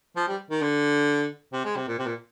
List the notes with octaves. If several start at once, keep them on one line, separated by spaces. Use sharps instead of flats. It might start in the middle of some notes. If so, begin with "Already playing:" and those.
F3
G3
D#3
D3
C3
G#3
C3
A#2
C3
A#2